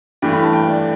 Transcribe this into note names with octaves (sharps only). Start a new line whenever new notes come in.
G2 E3 A3 G5
B5
A5
G5
D5